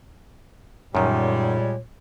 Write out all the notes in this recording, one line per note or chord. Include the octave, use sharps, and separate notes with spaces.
F#2 A#2 D#3 G3 G#3 C#5